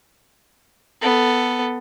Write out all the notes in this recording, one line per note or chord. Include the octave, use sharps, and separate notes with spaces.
B3 A4